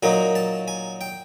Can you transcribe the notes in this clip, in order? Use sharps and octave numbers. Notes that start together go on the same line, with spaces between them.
A#2 F#3 A#3 D#4 G#5
A5
G#5
G5